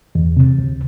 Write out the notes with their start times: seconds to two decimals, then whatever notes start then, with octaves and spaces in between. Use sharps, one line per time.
0.15 E2
0.37 C3
0.58 D2